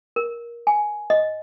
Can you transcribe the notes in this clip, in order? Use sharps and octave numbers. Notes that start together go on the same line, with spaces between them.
A#4
G#5
D#5